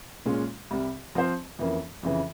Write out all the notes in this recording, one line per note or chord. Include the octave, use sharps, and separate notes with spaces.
A#2 G#3 C#4 F4
C2 C3 G3
F3 C4 F4 C5
F2 E3 A#3 C#4
F2 C#3 E3